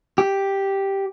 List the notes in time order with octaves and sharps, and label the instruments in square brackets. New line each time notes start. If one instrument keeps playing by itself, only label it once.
[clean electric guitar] G4